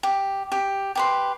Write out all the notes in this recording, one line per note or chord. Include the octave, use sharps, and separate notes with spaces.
G4
G4
G4 B4 C6